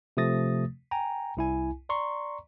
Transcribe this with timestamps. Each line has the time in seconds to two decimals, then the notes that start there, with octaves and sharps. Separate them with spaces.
0.17 C3 F3 A3 D#6 A6 A#6
0.91 G5 G#5 A#5
1.37 C2 E4 G#5
1.89 D5 A#5 C6 C#6